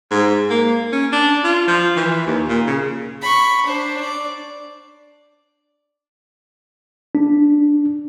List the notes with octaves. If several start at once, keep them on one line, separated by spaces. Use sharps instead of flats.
G#2
A#3
C#4
D4
F4
F3
E3
D#2
A#2
C#3
B5 C#6
D4 C5
D5
D4